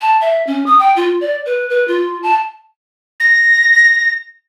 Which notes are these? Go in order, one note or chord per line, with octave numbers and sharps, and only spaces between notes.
A5
E5
C#4
D#6
G5
F4
D5
B4
B4
F4
A5
A#6